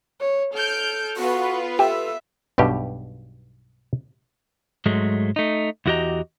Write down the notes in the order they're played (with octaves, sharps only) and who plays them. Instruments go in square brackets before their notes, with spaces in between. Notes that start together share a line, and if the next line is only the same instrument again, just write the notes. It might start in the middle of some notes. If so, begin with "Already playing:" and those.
[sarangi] C#5
[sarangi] A4 [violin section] F6 G6 D7
[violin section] B3 F4 B4 [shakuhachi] F#4
[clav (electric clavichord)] G4 [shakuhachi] A4 [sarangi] E5
[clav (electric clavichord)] B1 G2 B2 G4
[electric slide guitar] G#2 F#3 G#3 A3
A3 D#4
E2 E3 F#4 G4 D#5 A#5